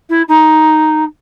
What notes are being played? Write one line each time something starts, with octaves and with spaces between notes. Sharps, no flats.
E4
D#4